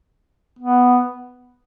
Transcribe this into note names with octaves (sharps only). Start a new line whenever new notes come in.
B3